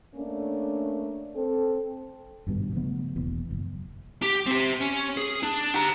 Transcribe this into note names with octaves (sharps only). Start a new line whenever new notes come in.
A3 A#3 C#4 D4
C4 A4
G#1 G2 B2
C#3 F3 A3 B3
E1 A#1 E2
F#1
G4
C4 G4
C#4
G#4
D4
G4 A#5